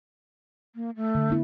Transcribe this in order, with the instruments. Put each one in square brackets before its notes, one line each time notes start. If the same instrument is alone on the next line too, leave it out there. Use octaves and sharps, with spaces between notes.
[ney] A#3
A3
[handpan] D3
B3 E4